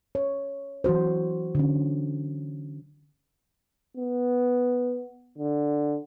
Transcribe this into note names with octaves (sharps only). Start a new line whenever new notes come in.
C#5
E3 F#3 F#4 C5
D3 C#4
B3
D3